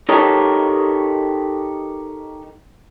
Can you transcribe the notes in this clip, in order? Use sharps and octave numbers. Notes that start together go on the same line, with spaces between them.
D#4 G4 A4 A#4 C#5 D#5